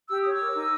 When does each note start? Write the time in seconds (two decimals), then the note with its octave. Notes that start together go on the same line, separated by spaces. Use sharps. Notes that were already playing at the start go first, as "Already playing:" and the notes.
0.09 G4 E6
0.21 C#5 D#6
0.32 D6 E6
0.40 A#4
0.56 D#4